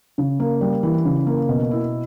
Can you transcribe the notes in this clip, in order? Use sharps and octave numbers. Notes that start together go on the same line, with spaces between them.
C#3
A#3
G3
E3
C#3
A#3
B2
E4